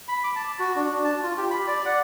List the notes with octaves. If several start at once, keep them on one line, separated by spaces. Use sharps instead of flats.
B5
D6
A5
F#4
D4
A5
F4
G4
B5
D5
F#5